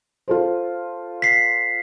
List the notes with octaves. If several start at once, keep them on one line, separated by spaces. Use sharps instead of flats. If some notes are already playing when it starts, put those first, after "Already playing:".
F4 A4 C5
B6 C7